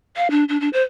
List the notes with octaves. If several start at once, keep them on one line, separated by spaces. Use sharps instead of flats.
F5
D4
D4
D4
C5